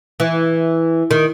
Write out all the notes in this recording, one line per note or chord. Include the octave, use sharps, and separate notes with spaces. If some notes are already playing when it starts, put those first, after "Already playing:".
E3
D#3